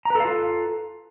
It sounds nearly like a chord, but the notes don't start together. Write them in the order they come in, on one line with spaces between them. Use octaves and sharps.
A#5 B4 A4 F5 F4